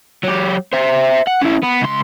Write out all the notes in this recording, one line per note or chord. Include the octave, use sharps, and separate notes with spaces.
F#3 G4
C5 E5
F#5
C#4 E4
B3
C#2 C6